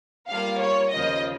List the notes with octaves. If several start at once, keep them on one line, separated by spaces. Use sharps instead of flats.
G3 A#3 F4 F5
C#5
D#2 C#3 F3 A#3 F4 D#5